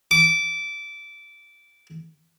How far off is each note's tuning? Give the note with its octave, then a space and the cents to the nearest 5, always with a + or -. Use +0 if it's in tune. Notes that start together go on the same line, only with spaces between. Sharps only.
D6 -15